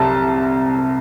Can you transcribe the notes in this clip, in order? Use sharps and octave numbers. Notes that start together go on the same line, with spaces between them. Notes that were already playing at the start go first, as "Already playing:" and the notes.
Already playing: C2 C3 A5